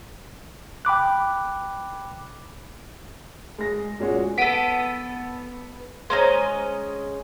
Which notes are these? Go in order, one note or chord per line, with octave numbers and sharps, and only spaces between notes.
G5 B5 D6 F#6
G#3 A#6
A#2 G#3 C#4 F#4
B3 A4 B6 D7 D#7
G#3 C#4 C5 D#5 A#5